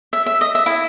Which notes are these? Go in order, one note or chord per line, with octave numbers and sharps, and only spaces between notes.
E5
E5
D#5
E5
E4